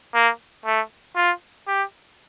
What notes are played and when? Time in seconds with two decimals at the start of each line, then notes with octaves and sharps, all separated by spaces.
0.15 A#3
0.66 A3
1.16 F4
1.68 G4